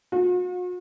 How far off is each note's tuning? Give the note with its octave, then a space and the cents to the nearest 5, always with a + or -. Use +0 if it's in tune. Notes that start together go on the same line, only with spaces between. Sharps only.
F#4 -45